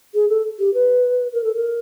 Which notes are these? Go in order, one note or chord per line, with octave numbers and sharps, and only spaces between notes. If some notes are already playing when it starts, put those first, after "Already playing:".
G#4
A4
G4
B4
A#4
A4
A#4